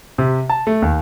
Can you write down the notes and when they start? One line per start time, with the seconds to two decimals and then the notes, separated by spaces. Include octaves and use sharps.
0.18 C3
0.49 A5
0.67 A3
0.82 D#2